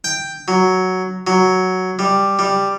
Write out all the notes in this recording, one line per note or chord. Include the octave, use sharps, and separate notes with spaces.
G5
F#3
F#3
G3
G3